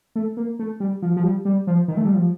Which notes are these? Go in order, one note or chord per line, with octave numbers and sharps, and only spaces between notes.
A3
A#3
A3
G3
F3
F3
G3
G3
F3
D#3
A3
G3
F3